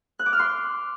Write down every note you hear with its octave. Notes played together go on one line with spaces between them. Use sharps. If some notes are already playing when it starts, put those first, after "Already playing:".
F#6
D6
F6
C6